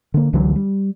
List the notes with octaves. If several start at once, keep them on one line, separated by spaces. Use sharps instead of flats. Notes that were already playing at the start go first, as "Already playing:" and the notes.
D3 A#3
C#2 D3 E3 F#3
G3